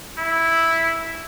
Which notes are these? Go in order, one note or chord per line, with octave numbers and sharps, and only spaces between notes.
E4